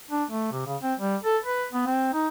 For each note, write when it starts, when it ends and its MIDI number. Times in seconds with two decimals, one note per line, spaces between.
0.11 0.24 62
0.30 0.48 57
0.52 0.64 48
0.66 0.76 49
0.82 0.94 60
0.99 1.16 55
1.23 1.37 69
1.44 1.66 71
1.72 1.86 59
1.86 2.12 60
2.13 2.28 63